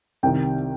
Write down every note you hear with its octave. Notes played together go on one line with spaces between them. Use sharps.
C2 C3 D#3 G5